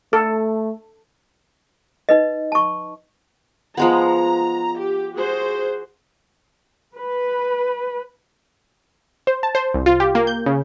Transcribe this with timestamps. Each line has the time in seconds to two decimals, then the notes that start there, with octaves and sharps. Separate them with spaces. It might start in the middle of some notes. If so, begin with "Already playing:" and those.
0.13 A3 A4
2.09 D#4 B4 D#5
2.52 A5 C#6
3.77 F3 G#3 B3 A#5
4.79 G4
5.15 F#4 G#4 C5
6.97 B4
9.27 C5
9.43 A5
9.55 C5
9.74 C2
9.86 F4
10.00 G4
10.15 A#3
10.27 G6
10.46 C#3